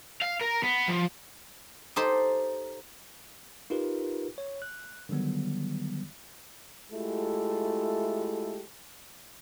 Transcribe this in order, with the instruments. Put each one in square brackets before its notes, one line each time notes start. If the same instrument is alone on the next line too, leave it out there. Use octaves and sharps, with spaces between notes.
[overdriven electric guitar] F5
A#4
B3
F3
[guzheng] D#4 G4 A4 C5
[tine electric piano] D#4 F4 G4 A#4 B4
C#5
F#6
D3 D#3 F#3 G3 B3
[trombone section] G#3 A3 E4 F4 G4 A4